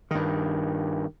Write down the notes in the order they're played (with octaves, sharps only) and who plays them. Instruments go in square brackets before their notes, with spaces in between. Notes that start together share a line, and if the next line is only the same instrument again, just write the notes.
[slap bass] G2 D#3